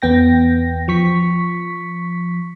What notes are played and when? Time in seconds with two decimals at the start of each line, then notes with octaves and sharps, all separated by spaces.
0.02 E2 B3 G5 A#6
0.88 F3 C#6 B6